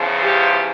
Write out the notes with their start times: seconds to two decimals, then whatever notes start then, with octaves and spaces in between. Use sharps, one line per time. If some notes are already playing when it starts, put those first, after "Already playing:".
Already playing: E2 C#3 F3
0.22 G4